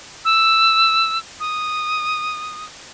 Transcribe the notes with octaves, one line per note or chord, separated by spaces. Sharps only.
E6
D#6